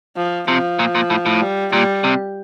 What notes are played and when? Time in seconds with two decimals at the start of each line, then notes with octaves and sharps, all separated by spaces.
0.17 F3
0.48 C3 F3
0.79 A#2
0.95 A#2
1.10 A2
1.26 A2
1.42 G3
1.73 A#2 G3
2.04 C3